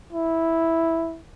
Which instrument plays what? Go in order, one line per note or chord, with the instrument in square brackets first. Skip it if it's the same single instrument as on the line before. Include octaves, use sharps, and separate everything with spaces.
[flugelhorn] E4